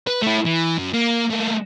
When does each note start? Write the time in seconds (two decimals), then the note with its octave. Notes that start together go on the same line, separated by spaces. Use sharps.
0.07 B4
0.22 A3 E4
0.45 E3
0.78 F#2
0.94 A#3
1.31 A3 A#3